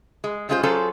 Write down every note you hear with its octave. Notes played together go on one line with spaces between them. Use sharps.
G#3
G3 G#3 C#4 F4 G#4 C5
F#3 C#4 F4 G#4 A4 C5